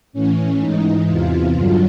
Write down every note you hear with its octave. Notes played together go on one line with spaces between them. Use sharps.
A2 E3 C#4
G#2 E3 D#4
E2 C3 E3 F4
G2 D3 F#3